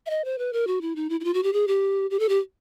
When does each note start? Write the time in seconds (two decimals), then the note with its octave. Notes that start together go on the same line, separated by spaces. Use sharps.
0.06 E5
0.10 D#5
0.25 C5
0.38 B4
0.53 A#4
0.67 F#4
0.81 E4
0.96 D#4
1.10 E4
1.20 E4
1.24 F4
1.34 F#4
1.43 G4
1.53 G#4
1.67 G4
2.10 G4
2.19 A4
2.29 G4